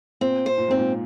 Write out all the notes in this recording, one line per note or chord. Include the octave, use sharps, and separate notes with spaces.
A#2 C4
C5
A#2
G#2 C4
A#2